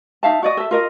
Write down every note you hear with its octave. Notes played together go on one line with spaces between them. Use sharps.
D#4 E5 F5 A5
F#4 D5 D#5
A4 E5
F4 A#4 D#5